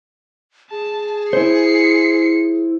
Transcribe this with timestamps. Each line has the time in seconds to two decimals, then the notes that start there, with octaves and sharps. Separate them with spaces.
0.71 G#4 A5
1.33 E4 C5 C7 C#7